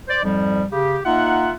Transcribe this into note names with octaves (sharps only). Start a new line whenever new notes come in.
C5 D5
F2 G#2 F3 G3
C#3 G4
A#3 D#4 F4 E5 F#5